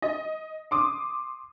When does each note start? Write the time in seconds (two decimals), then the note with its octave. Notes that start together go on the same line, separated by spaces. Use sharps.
0.02 D#5
0.71 C6 D6 D#6